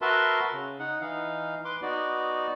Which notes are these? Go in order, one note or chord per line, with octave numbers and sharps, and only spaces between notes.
F#4 A#4 B4 E5 A5 C6
C#3
D#4 F#5
E3 D#4 F5
B4 C6 D6
B3 D#4 F#4 D5